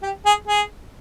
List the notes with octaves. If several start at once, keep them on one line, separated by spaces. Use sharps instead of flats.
G4
G#4
G#4